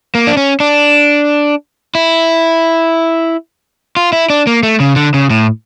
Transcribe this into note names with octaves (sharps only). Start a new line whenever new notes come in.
A#3
D4
C#4
D4
E4
F4
E4
D4
A#3
A3
C#3
D3
C#3
A2